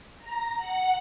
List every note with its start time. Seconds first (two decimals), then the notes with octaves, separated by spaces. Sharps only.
0.19 A#5
0.57 F#5